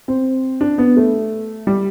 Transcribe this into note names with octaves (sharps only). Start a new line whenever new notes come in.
C4
D4
B3
A3
G3